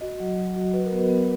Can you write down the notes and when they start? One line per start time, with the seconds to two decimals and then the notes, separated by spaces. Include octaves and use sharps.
0.01 F#4 D#5
0.20 F#3
0.38 F#3
0.56 F#4
0.74 F#4 B4
0.86 A#4
0.92 B3 B4
1.10 B3